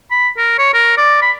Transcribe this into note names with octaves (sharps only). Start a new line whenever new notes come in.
B5
A#4
C#5
A#4
D5
B5